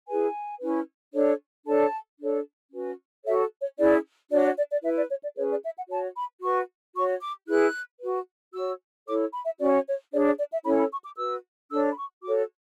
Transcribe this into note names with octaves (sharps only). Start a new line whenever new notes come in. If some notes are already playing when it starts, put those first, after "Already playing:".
E4 G#4 B4 G#5
C#4 E4 B4
D4 A4 C#5
D4 A4 C#5 A5
D4 A4 C#5
C#4 F#4 B4
F#4 A4 C#5 E5
C#5
C#4 E4 G#4 D5
D4 F#4 C#5 D5
D5
D5
D5
E4 B4 E5
D5
C#5
D5
C#4 G#4 B4 C#5
D5
E5
F#5
F#4 C#5 A5
B5
F#4 B4 C#6
F#4 C#5 C#6
D6
E4 G#4 B4 F#6
F#4 B4
F#4 C#5 E6
E4 A4 C#5 D6
B5
E5
C#4 F#4 C#5 D5
C#5
D4 G#4 C#5 D5
D5
D5
E5
C#4 E4 A4 C#5 B5
B5
C#6
D6
F#4 B4 E6
D4 A4 C#5 E6
B5
C#6
F#4 A4 C#5 D6